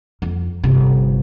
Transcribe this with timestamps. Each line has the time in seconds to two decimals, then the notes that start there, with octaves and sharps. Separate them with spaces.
0.22 F2
0.63 G1 C3